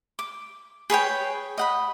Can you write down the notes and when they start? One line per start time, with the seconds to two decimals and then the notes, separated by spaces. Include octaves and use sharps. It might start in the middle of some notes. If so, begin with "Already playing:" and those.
0.19 D6
0.90 G#4 B4 C#5 G5
1.58 D#5 F#5 B5